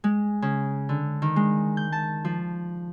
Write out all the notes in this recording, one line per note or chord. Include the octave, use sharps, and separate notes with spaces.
G#3
C#3
D3
D#3
G#3
G6
A5
F3